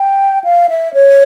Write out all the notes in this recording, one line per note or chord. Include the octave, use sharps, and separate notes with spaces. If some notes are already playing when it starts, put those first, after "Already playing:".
Already playing: G5
F5
E5
C#5